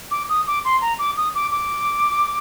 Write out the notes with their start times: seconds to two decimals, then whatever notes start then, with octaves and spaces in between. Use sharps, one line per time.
0.11 D6
0.29 D#6
0.47 D6
0.65 C6
0.81 A#5
0.99 D6
1.17 D#6
1.35 D6
1.51 D6